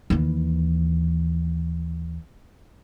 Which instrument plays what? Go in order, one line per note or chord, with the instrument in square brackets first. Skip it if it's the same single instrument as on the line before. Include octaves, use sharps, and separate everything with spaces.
[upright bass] D#2 E3